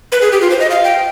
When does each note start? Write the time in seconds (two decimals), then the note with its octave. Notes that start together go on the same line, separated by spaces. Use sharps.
0.12 B4
0.22 G#4
0.32 G4
0.41 F4
0.50 C5
0.60 D#5
0.70 F5
0.84 G5